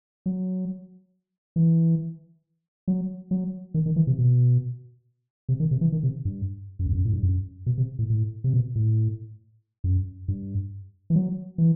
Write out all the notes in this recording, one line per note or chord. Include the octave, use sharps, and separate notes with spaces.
F#3
E3
F#3
F#3
D#3
D#3
E3
C3
B2
C3
D#3
C3
E3
D#3
C3
G2
F#2
E2
F#2
A2
G2
F#2
B2
C3
A2
A2
C3
B2
A2
F#2
G2
E3
F#3
E3